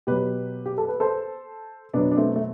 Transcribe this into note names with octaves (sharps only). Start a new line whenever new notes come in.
B2 F#3 G4 B4
G4
A4
B4
A4 C5
B2 F#3 B3 D4
D4
A3 C4
A3